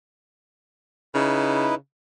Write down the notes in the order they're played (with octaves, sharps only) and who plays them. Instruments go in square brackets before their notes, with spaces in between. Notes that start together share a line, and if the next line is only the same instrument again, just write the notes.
[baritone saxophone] C#3 [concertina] D#4 E4 B4